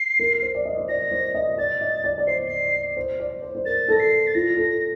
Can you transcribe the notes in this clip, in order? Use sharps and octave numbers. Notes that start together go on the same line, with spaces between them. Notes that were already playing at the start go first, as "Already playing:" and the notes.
Already playing: C7
A#4
C5
D5
D#5
C5
D5 A#6
C5
D#5
D5 A6
D#5
D5
D5
C5 C7
C7
C5
D5
C5
C5
A#4 A6
A4 A#6
C7
A6
F4 A#6
A4